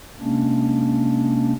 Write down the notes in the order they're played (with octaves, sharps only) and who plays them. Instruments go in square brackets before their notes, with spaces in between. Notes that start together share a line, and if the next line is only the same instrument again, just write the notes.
[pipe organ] C3 G#3 A#3 C#4 D4